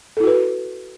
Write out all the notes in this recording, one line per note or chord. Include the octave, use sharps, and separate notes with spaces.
E4 F#4 A4 B4